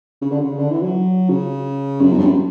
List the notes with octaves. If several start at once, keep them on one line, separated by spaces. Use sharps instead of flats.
C#3
D3
C#3
D3
E3
F#3
C#3
F#2
E2
G2
F#2